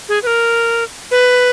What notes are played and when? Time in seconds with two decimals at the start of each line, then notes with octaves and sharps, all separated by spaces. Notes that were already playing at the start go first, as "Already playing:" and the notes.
0.09 G#4
0.23 B4
0.27 A#4
1.11 B4